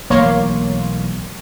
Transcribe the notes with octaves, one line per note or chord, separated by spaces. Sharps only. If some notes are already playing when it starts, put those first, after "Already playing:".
B1 E3 A3 A#3 C#5 C6